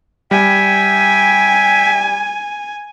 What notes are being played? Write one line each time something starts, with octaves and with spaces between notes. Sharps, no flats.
G3 E5 G5 G#5